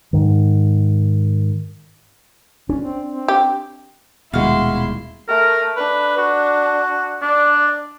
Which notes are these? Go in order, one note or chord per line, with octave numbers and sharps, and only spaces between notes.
G#2 D#3
C#4 D4
C4
C4
G4
D#1 B2 D#3 G#3 E4 F#4 F5 C6
A3 A#4
D4 B4
F#4
D4 D5